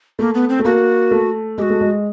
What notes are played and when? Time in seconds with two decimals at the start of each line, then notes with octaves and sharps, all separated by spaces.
0.19 A3 A#3
0.34 B3
0.49 C4
0.60 A3
0.65 A#3 F#4
1.11 A3
1.58 G#3 F#4 G4
1.70 A3
1.81 G#3